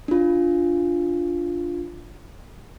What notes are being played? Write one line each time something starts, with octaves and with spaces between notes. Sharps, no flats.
D4 F4